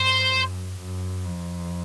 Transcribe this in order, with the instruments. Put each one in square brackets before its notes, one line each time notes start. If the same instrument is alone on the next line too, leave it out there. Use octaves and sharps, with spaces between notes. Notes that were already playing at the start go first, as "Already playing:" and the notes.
Already playing: [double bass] G2 [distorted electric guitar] C5
[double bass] F#2
F#2
F2